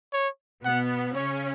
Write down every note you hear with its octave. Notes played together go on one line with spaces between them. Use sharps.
C#5
B2 B3 F#5
C#3 C#4 C#5